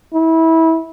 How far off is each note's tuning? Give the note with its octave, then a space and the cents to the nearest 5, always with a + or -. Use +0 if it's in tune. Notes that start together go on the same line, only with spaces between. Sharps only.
E4 -25